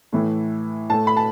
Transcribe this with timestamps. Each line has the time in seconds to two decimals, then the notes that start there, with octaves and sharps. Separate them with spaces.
0.12 A2 E3 A3
0.89 A2 A3 A5
1.07 B5
1.17 A5